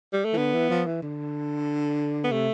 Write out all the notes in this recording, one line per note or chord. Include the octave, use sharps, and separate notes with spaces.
G3
A3
E3
D3 B3
E3
F3
E3
D3
B3
C3 A3